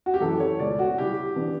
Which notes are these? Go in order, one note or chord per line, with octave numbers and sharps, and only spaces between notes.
F#4
G4
F#2 E3 A3 E4 A4
C#5
C#2 B2 A3 D5
F#4
C#3 G3 C#4 E4 G4
E3 B3 D4